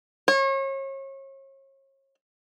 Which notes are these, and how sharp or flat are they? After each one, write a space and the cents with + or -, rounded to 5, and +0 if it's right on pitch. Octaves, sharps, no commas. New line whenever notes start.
C#5 -35